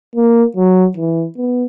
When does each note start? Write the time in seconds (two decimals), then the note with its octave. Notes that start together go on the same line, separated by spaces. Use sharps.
0.16 A#3
0.57 F#3
0.97 E3
1.37 B3